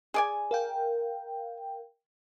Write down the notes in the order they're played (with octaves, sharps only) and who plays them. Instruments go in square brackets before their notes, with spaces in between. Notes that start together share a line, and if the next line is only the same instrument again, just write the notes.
[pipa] G#4 D5 G#5
[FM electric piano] A#4 F5 G5